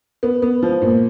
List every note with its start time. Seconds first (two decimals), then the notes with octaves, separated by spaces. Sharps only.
0.23 B3
0.42 B3
0.63 F3
0.82 A#2